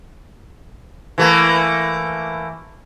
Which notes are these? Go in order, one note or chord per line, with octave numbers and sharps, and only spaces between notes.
E3 A3 A#3